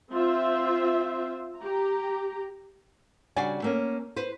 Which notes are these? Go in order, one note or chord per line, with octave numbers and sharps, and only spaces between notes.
C4 F4 C5 E5
G4 A#5
C#3 G3 D4 F#4 D5 G#5
A3 A#3 C#4
B4 C5